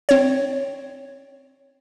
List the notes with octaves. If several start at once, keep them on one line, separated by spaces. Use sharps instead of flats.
C4 C#5